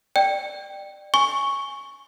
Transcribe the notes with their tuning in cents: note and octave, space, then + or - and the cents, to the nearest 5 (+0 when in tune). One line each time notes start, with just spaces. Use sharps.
D5 +25 G5 -5
G#5 +0 C#6 +0